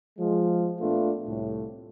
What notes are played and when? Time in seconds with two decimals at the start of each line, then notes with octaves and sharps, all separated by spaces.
0.19 F3 G#3
0.80 A#2 A3 B3 D4 F4
1.27 C2 A2